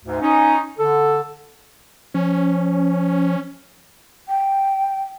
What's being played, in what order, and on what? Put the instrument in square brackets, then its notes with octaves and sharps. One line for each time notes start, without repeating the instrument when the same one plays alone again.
[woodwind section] D2 G#2
C#4 D#4
D3 A4
[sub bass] F3 [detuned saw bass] C#4
[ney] G5